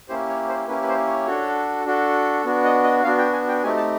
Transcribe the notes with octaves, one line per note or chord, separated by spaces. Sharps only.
A#3 C#4 E4 G4 C5
C#5
C5
A#3 C#4 E4 G4 B4
B4
C5
C#5
D4 F#4 A4
D4 F#4 A4
B3 D4 F#4
D#5
D#5
B3 D4 F#4 F5
G5
G#5
G5
A3 C4 D#4 G4 G#5
A5